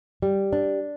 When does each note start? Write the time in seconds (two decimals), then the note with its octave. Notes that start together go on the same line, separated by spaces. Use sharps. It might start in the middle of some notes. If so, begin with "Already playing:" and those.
0.22 G3
0.53 D4